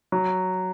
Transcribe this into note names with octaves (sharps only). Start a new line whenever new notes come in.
F#3